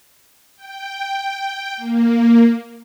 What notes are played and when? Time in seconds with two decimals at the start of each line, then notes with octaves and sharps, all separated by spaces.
0.56 G5
1.77 A#3